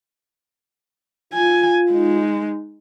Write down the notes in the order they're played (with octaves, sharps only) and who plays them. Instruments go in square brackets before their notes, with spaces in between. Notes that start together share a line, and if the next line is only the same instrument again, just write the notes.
[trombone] F4 [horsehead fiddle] G#5
[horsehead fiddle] G#3 D#4